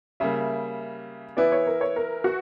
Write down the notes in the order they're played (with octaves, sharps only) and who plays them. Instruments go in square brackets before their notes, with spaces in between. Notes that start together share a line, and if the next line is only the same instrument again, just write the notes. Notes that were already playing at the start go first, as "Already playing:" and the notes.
[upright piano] C#3 G3 A#3 [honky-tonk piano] E5
[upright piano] E3 B3 E4 B4 [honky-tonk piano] D5
[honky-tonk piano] C#5
A#4
C#5
A#4
F#4